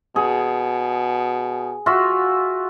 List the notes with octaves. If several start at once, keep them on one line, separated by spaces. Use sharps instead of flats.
B2 G#4
F4 F#4 E5